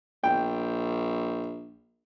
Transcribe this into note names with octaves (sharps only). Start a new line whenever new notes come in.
A#1 G5